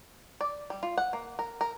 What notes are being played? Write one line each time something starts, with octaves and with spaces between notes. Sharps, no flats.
D5
G3
F4
F#5
A#3
A#4
A#4